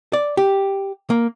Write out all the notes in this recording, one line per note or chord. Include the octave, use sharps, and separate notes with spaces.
D5
G4
A#3